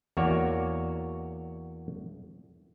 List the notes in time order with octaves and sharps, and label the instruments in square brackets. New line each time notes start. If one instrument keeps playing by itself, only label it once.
[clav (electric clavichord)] E2 A#3 F#4 C#5 D5